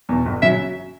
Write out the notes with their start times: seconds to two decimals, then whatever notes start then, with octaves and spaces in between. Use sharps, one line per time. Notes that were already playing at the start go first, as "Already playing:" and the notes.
0.09 E2 B2
0.26 G1
0.42 C#3 F#3 E5